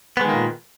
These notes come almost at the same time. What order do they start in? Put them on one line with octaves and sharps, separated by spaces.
B3 G#3 D#3 A#3 A#2